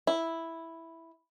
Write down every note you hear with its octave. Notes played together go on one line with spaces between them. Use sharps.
E4